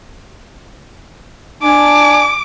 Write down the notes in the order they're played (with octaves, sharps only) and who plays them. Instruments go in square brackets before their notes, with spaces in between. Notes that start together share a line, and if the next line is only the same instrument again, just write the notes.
[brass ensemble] D4 G#5 [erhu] D6